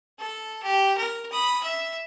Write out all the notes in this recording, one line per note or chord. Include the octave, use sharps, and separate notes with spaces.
A4
G4
A#4
B5 D#6
E5